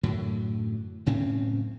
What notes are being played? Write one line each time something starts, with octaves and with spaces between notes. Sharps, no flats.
F#2 A2 D3 F#3
F#1 A2 C4 C#4